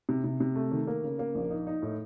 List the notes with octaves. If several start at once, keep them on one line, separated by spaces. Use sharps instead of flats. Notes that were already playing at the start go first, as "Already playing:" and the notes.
C3
C3
C3
A3
D#3
A#3
C#3
A#3
A#1
D#4
D#4
A2